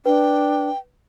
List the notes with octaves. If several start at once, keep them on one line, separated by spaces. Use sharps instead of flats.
D4 B4 G5